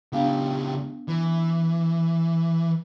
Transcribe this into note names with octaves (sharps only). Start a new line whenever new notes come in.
C#2 B3 D4 G4 F5
E3